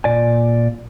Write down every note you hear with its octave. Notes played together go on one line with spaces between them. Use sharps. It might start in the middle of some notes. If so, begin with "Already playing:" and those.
A#2 D5 G#5